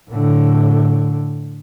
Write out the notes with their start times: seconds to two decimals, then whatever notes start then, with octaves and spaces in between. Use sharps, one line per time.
0.10 A2 D3